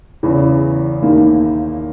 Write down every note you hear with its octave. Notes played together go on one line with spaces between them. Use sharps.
E2 C#3 E3
D#2 D#3 A#3 E4